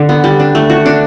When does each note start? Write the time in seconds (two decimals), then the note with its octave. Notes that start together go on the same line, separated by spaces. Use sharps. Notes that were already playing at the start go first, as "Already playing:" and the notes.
Already playing: D3
0.09 B3
0.24 G3
0.40 D4
0.55 A3
0.70 F#4
0.86 D4